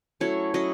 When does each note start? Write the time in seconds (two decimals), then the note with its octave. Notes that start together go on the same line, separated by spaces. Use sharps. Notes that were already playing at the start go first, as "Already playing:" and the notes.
0.20 F#3 A3 C#4 E4 C#5
0.54 F#3 A3 C#4 E4 D#5